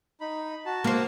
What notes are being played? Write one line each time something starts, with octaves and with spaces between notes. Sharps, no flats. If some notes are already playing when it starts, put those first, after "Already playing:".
D#4 B5
F#4 A5
A#3 C5